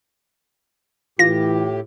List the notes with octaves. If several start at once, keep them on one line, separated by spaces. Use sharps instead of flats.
A2 E3 F4 G4 A#6